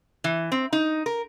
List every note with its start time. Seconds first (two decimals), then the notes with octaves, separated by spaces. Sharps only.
0.24 E3
0.52 C4
0.73 D#4
1.06 A#4